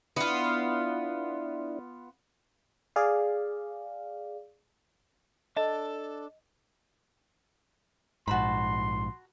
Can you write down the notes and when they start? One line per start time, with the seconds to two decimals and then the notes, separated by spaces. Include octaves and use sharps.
0.16 B3 D4 E4 F4
2.96 G#4 D5 F5
5.57 D4 A4 D#5 A5
8.28 A#1 G#2 F#4 A5 B5 C6